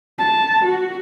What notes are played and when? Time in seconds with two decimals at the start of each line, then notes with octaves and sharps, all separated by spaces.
0.18 A5
0.64 F#4